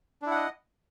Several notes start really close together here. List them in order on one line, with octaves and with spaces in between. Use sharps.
D4 E4 F#5 D#5